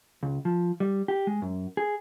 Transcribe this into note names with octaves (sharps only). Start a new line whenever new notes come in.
C#2
F3
G3
G4
G#3
F#2
G#4